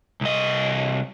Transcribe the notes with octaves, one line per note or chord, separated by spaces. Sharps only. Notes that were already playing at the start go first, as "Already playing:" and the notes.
C2 D#5